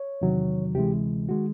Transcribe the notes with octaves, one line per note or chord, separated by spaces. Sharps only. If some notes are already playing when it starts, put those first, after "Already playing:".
Already playing: C#5
E2 C3 D#3 F#3
D2 C3 E3 G#3 G4
D#3 G#3 F#4